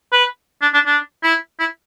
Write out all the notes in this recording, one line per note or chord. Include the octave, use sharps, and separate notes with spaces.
B4
D4
D4
D4
E4
E4